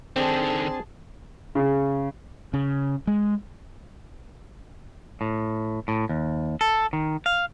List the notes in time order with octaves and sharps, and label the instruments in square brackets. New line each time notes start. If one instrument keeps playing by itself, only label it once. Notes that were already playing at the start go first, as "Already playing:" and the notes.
[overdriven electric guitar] D3 D#3 [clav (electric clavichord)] C4 D4 [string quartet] G#4 A5 C6
[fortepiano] C#3
[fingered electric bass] C#3
G#3
[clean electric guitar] A2
A2
D#2
A4
D#3
F5